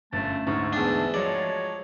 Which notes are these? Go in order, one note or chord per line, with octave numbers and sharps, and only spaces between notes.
G1 F#2 A3 A5
D2 G#2 C#5
E2 D4 A5
F3 F#3 G#3 C#5 D5